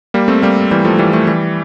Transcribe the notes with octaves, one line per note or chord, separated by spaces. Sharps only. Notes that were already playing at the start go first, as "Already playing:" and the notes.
G3 A#3
A3 C4
G3 A#3
E3 G3
F3 A3
E3 G3
F3 A3
E3 G3